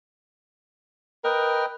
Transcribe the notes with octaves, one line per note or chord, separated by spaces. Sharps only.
A#4 B4 D#5 G5